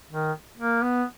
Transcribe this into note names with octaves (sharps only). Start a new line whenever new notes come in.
D#3
A#3
B3